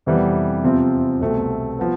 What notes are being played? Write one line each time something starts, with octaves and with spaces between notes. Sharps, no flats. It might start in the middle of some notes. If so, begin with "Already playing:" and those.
F2 C3 E3 G3 B3
E2 C3 F3 C4 F4
C2 B2 A3 C4
F3 B3